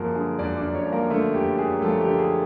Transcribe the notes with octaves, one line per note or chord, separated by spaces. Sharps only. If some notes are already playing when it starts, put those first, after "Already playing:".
Already playing: F#2 F3 A#3 G#4 A#4
D3 G#4
F#2 D4 D5
D4 D5
F#2
C#4 C#5
F3
A#3 A#4
D3 A3 A4
F#2 G4
F#2 G#4
F3 A3 A4
G4
D3
G#4